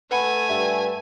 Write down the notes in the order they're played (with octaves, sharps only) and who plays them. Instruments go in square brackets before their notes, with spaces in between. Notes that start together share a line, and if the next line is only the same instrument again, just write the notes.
[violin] A3 G#5 [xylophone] B4 F#5 B5
[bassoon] G2 [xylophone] E5